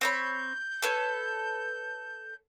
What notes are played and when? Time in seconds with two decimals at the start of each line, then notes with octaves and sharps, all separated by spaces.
0.01 C4 C#5 B5 G6
0.82 A4 B4 C#5